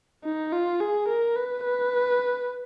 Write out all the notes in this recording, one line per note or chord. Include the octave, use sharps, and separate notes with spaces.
D#4
F4
G#4
A#4
B4
B4